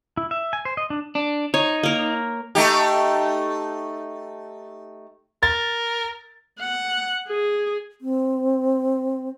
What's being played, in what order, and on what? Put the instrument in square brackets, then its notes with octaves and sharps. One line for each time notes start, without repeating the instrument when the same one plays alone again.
[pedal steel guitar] E4
E5
G#5
C5
D#5
D4
[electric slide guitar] D4
[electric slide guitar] D#4 [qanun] C#5
[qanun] A#3 A#4
[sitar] A3 D#4 G4
[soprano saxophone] A#4 [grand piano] A6
[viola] F#5
G#4
[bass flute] C4